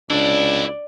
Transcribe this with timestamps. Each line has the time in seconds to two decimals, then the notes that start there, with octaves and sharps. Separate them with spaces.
0.10 C#2 C3 D4 E4 D5